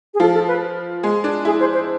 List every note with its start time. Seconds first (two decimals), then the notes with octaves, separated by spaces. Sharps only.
0.14 G#4
0.20 F3 F4 A4
0.34 A4
0.48 B4
1.03 G#3 G#4
1.24 D4
1.45 E4 G#4
1.60 C5
1.73 C5